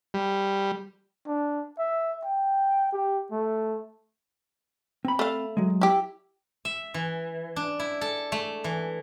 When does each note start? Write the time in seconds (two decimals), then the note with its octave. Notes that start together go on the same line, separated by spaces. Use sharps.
0.14 G3
1.28 D4
1.78 E5
2.24 G5
2.93 G4
3.32 A3
5.05 C4 B5
5.19 A3 F5
5.57 F#3 G#3
5.81 E4 G4
6.65 E5
6.94 E3
7.56 D4
7.80 E4
8.01 A4
8.32 A3
8.64 E3